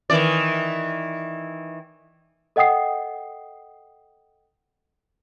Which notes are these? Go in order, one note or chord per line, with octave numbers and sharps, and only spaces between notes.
D#3 E3 D5
A4 D#5 F#5 G5 D#6 C7